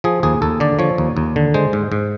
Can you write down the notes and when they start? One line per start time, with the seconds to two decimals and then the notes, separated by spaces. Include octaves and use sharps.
0.04 F3 G#4
0.23 D#2 G#4
0.42 D#2 A4
0.60 D3 D5
0.79 F3 C#5
0.98 D#2
1.17 D#2
1.36 D3
1.54 G#3 C5
1.73 G#2
1.92 G#2